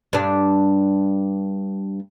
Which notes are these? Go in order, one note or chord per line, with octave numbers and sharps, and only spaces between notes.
G2 D4